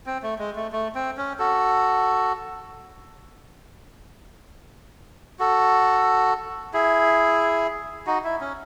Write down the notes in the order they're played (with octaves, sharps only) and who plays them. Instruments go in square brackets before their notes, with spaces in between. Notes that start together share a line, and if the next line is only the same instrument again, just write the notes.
[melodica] C4
A3
G#3
A3
A3
C4
C#4
F#4 A4
F#4 A4
E4 G#4
D#4 F#4
E4
C#4